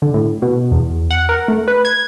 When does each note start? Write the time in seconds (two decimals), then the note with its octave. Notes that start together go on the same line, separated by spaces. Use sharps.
0.02 D3
0.14 A2
0.42 B2
0.71 E2
1.11 F#5
1.29 A#4
1.48 A3
1.68 B4
1.85 G#6